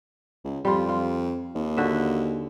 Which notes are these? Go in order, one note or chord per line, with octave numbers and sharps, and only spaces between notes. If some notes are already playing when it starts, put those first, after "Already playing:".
C#2
F2 G3 F4
F4
D#2
D3 F#4 E5